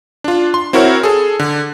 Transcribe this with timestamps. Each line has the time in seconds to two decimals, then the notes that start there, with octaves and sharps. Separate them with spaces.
0.24 D4 F4
0.54 C6
0.73 C4 E4 F#4 A#4 C#5
1.03 G#4 A4
1.39 D3